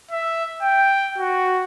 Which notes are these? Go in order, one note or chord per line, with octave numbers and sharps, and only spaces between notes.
E5
G5
F#4